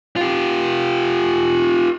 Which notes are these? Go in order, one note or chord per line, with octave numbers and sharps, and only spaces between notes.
F4 G4